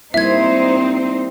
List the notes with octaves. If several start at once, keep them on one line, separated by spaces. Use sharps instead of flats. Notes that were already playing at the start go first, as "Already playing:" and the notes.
G3 A#3 C4 D#4 E4 C5 E5 G#6